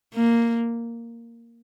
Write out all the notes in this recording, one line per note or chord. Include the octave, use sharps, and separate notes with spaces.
A#3